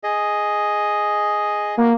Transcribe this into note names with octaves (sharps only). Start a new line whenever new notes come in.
G#4 D#5
A#3 F#4